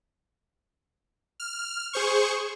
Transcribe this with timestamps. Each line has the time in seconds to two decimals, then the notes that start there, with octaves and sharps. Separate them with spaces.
1.40 F6
1.93 G#4 C5 C#6